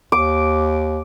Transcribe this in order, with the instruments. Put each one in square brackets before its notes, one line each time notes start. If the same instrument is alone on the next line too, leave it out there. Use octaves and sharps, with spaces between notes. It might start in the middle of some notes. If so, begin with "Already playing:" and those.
[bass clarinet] D#2 [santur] D6